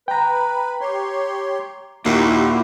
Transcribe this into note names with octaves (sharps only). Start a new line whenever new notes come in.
B4 G5 A#5
G4 C#5 C6
D#2 A#2 E4 F#4 G4